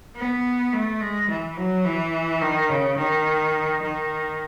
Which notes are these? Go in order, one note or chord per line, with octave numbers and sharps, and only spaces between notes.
B3
A3
G#3
E3
F#3
E3
D#3
C#3
D#3
D#3